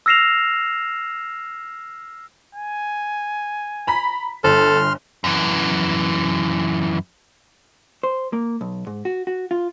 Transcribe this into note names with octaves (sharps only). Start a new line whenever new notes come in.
E6 F6 A#6 C7 E7 F7
G#5
A#5 B5 B6
G1 A4 C6 F6
F#2 E3
C5
A#3
B1
G#2
F#4
F#4
F4